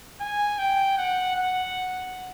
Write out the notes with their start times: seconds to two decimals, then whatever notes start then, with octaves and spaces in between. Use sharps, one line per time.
0.21 G#5
0.58 G5
0.98 F#5
1.35 F#5